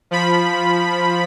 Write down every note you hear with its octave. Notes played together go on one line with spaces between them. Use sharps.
F3 B5